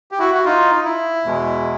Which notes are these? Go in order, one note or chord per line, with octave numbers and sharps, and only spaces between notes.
G4
E4 F#4
F#4
D#4 F4
D#4
E4
E2 B2 G#3